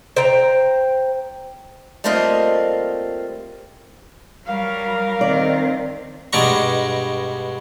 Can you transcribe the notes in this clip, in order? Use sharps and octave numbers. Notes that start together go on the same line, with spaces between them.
C5 G5 A#5
G3 A3 A#3 C4 F4 D#5
F#3 G3 A#4 F5
D#3 C4 D5
G2 B2 G#3 D4 A#5 C#6